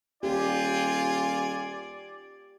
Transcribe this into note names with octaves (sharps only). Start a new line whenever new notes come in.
D#1 F4 G4 D5 G#5